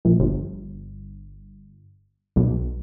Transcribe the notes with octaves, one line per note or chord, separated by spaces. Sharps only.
A#1
G1
B1